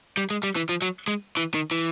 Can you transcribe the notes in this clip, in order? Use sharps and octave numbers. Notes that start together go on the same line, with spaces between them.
G3
G#3
G3
E3
F3
F#3
G#3
E3
D#3
E3